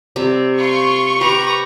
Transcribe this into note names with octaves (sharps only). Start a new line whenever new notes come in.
C3 G3 E5
F4 C#6
G4 B4 A#5